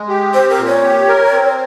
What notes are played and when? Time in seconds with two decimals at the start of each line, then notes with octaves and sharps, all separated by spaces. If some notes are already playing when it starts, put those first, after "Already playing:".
Already playing: G#3
0.09 G4
0.34 C4 C5
0.50 A#4
0.58 A#2
0.67 C#5
0.83 G4
1.08 A#4
1.32 C4